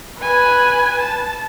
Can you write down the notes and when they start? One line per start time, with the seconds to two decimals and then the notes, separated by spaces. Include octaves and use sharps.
0.22 B4 G#5
1.00 A5